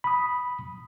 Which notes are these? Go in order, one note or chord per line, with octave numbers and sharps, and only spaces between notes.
B5 D#6